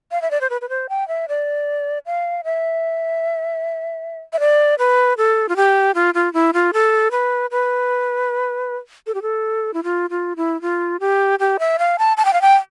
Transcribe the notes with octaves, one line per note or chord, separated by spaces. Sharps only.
F5
E5
D5
C5
B4
B4
C5
G5
E5
D5
F5
E5
E5
D5
B4
A4
F4
G4
F4
F4
E4
F4
A4
B4
B4
A4
G4
A4
E4
F4
F4
E4
F4
G4
G4
E5
F5
A5
A5
G5
F5
G5